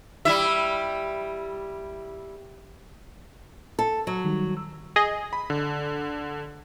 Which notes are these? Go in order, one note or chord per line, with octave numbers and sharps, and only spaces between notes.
G3 E4 E5
A4
F#3
D#3 G3
E6
G#4 D#5
B5
D3